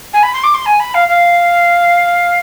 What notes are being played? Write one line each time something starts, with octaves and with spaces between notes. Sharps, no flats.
G#5
B5
C6
D6
C6
G#5
B5
F5
F5